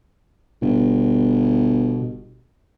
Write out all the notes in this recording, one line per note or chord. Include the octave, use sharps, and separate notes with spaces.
G1 B2